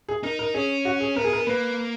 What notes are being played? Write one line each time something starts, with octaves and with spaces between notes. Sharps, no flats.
G#4
D#4 A#4
A#4
C#4 G#4
F#4
G#4
B3 A#4
G#4
A#4
A#3 B4